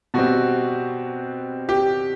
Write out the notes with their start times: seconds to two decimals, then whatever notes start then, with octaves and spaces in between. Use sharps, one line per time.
0.14 B2 G3 C4 F#4
1.69 G4